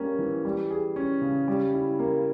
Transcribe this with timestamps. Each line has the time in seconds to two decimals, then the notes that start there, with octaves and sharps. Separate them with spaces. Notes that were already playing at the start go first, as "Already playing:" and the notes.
Already playing: G3 A#3 C#4
0.19 E3
0.45 G3
0.70 G#4
0.96 C#4
1.21 C#3
1.48 G3
1.73 E4
1.99 A#3